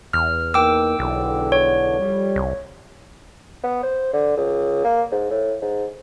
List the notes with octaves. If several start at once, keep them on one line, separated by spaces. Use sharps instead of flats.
E2 F6
A#3 D#4 A#4 G5 D6 E6
B1 E2 D3
C#5
F2 G3
C2
B3
C5
D3
C#2
A#3
G#2
A2
G#2